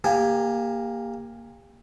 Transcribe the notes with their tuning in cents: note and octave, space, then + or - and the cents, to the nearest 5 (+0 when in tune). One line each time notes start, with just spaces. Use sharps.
A#3 +0 G4 +30 G#5 +0